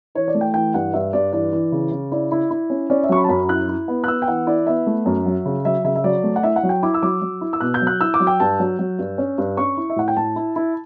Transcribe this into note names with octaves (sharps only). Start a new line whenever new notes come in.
E3 C#5
D5
A3
G5
E3 G5
G2 F#5
G2 E5
G2 D5
E3 D5
E3
C#3
C#3
E4 D5
E4
E4
C#4
C#4 D5
E5
F#3 C#6
B5
A5
F#2 B5
E4 F#6
E4
B3
F#6
B3 E6
G5
E3 F#5
E4 D5
B3 E5
A3
F#2
F#3
C#3
F#3 E5
C#3 E5
E5
F#3 D5
A3
F#5
E4 E5
F#5
F#3
G5
E4 D6
E6
F#3 D6
F#3
E4
E6
B2 F#6
G6
F#3
F#6
E4 E6
D6
F#3
G5
G2 A5
F#3
F#3
G2
C#4
G2
C#4 C#6
E4
E5
A2 F#5
G5
A2 A5
E4
E4